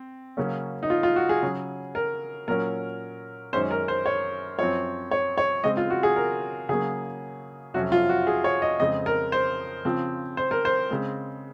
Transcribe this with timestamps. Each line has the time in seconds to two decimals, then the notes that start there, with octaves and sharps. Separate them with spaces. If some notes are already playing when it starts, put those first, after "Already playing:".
Already playing: C4
0.37 C#3 F#3 A#3 C#4
0.83 D#4
0.90 F4
1.03 F4
1.16 F#4
1.29 G#4
1.42 C#3 F#3 C#4
1.95 A#4
2.48 A#2 F#3 C#4 A#4
3.53 F#2 D#3 G#3 C#4 C5
3.71 A#4
3.88 C5
4.06 C#5
4.59 F#2 F3 C4 C#5
5.11 C#5
5.38 C#5
5.64 C#3 G#3 C4 D#5
5.77 F4
5.90 F#4
6.03 G#4
6.16 A#4
6.69 C#3 F#3 A#3 G#4
7.74 F2 C3 F#3 C#4 F#4
7.92 F4
8.09 F#4
8.27 G#4
8.44 C#5
8.62 D#5
8.80 F2 C#3 G#3 C4 D#5
9.06 A#4
9.32 C5
9.85 C#3 F3 C4
10.37 C5
10.51 A#4
10.65 C5
10.91 C#3 G#3 C4